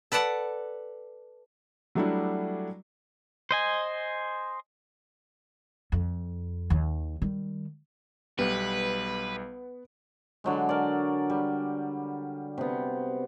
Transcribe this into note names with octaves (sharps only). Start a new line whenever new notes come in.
A4 B4 D5 F#5 A5
F#3 G3 A3 D4 E4 F#4
C5 D#5 G#5
F2
D#2 D#3
D#3 G3
B1 G3 B3 B4
D3 F#3 G#3
A#4 D5
G3
C3 B3